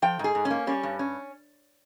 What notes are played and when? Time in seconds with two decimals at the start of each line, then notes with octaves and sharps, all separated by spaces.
0.02 F3 G5
0.19 G#2 G#4
0.35 G#2
0.45 C#4
0.50 A#3
0.67 G3 C#4
0.83 G2
0.99 C#4